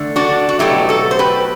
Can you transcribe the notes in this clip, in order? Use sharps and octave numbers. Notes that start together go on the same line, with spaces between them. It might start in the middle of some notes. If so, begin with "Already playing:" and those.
Already playing: D3 A3
D4 F#4
F#4
B2 F#3 A3 E4 G4
F#4 A4
C5
G4 B4